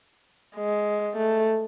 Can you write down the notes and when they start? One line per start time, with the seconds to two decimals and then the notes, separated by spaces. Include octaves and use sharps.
0.56 G#3
1.16 A3